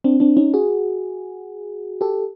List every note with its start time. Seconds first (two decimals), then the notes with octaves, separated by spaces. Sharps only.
0.04 C4 D4
0.20 C4 D4
0.37 C#4 D#4
0.54 F#4 G#4
2.01 G4 A4